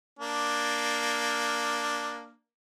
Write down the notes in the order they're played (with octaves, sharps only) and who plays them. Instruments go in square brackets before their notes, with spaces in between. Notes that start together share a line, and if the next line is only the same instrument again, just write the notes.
[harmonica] A#3 D4